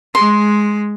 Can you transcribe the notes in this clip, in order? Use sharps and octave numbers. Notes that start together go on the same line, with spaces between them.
G#3 C6